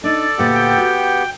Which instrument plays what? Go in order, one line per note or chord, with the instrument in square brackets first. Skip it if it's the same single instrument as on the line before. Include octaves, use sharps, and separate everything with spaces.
[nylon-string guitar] D4 D#4 [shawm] A4 [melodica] D5
[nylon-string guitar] D2 A#2 C5 [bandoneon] B3 G4 F#5
[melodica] G5
[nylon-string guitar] F#4